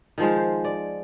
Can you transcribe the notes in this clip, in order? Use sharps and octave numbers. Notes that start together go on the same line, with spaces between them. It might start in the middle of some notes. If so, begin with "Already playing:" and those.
D#3 F3 G#3
C5
D5